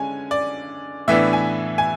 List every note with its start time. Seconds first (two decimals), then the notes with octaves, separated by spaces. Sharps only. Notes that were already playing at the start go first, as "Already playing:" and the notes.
Already playing: D3 G#3 C#4 G#5
0.31 D5
1.08 A2 E3 B3 D4 E5
1.33 G#5
1.78 G#5